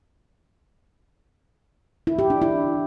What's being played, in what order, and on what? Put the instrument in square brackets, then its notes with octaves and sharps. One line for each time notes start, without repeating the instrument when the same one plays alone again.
[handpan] E4
G4
D4
E4